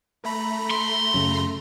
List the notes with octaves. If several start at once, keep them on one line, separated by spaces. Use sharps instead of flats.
A3 A#5 B5
C6
F#2 C#3